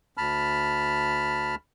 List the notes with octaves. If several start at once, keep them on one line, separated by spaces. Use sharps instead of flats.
D2 A5 B5 F6